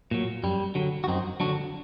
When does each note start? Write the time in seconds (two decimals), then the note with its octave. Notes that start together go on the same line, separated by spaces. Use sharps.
0.11 A#2 F#3
0.43 F#2 G3
0.75 D3 F#3
1.04 F#4
1.08 F#2 C4 D#4
1.40 D3 F#3 D4 F#4